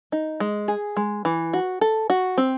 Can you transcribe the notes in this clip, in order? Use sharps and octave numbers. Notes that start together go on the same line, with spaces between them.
D#4
G#3
G#4
G#3
E3
F#4
A4
F#4
C4